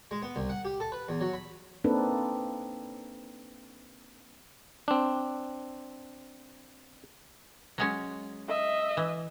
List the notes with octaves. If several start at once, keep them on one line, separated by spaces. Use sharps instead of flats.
G#3
B3
C2
F#5
G4
A4
B4
E2
F#3
B5
A#3 C4 D4 D#4 A4 B4
C4 D4
F#3 G#3 C#4
D#5 E5
E3